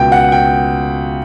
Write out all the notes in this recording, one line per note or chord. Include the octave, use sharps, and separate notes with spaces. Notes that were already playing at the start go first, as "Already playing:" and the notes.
Already playing: C#2 B2 G5
F#5
G5